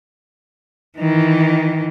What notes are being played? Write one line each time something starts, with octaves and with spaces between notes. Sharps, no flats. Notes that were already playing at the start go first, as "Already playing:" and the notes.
D#3 E3